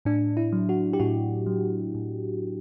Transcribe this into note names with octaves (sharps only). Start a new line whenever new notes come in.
A2 D4
E4
F#3
F#4
G4
A2 F#4
F#3
A2